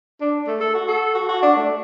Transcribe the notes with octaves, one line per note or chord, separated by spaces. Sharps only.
D4
A3
A4
F#4
A4
F#4
F#4
D4
A3